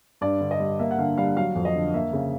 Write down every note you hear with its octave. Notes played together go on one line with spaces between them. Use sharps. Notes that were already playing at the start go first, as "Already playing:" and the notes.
G2 D5
D3
D#5
G3
A#3 E5
F#5
D3 F5
G3 F5
F#3 F5
F2
D#5
D3
A#3 E5
C#3